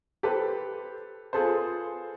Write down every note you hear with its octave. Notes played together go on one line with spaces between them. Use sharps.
G4 A4 B4 C5
F4 G#4 A4 B4 C5